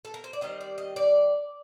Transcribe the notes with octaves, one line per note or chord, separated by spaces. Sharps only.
A4
A#4
C5
D5
D#3 G3 C4 D#5
D5
D#5
D5